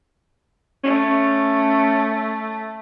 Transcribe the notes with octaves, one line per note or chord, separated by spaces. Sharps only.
A3 C#4